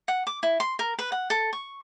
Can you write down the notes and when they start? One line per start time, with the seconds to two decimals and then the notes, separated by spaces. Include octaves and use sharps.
0.08 F#5
0.27 D6
0.43 E4
0.60 C6
0.79 A#4
0.99 B4
1.12 F#5
1.30 A4
1.53 C#6